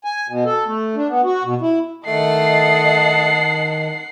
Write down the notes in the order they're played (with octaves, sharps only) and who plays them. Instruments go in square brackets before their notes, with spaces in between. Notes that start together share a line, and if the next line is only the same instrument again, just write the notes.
[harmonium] G#5
B2
A4
A3
D4
B3
F#4
B2
E4
[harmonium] D#3 [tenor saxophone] A3 [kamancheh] D#5 A5 [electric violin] F#5 C7